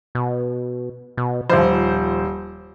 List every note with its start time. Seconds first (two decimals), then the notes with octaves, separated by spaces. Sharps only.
0.15 B2
1.17 B2
1.49 D#1 F3 C5